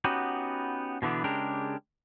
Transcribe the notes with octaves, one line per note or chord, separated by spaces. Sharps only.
B3 C#4 D#4 F#4 G4
B2 D3 E3 B3 D4
C#3 G#3 D4 G4 A#4